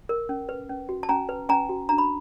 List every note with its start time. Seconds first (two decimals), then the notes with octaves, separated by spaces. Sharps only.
0.09 A#4
0.29 C#4
0.49 B4
0.69 C#4
0.89 F#4
1.03 A5
1.09 C#4 G#5 A#5
1.29 B4
1.49 C#4 G#5 A#5
1.69 F#4
1.89 D4 A#5
1.98 B5